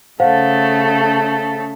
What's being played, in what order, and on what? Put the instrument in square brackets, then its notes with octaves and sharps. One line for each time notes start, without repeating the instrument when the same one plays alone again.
[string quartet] C#3 A3 A4 [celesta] C5 F5 F#5